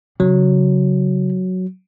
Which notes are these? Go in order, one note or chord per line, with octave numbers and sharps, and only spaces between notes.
C#3 F#3